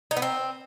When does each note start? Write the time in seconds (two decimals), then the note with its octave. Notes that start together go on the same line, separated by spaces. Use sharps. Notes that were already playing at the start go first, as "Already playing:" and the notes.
0.11 D#4
0.17 B3
0.22 C4